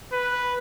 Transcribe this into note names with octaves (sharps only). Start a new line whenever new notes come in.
B4